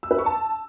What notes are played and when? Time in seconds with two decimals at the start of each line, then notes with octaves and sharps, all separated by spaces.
0.03 E6
0.11 B4
0.18 C#6
0.26 A5